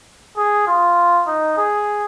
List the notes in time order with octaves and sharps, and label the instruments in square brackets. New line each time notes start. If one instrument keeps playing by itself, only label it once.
[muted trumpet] G#4
F4
D#4
G#4